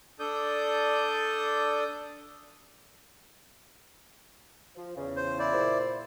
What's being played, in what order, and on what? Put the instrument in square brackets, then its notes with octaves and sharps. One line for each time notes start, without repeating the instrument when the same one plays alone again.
[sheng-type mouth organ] D4 A4 D5 D#6 G6
[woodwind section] F3
E2 C#3
[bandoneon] C5
E4 D5
[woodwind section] A#2 C5